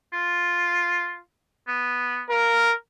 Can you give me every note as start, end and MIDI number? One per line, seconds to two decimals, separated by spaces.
0.13 1.18 65
1.68 2.23 59
2.30 2.73 70
2.30 2.67 77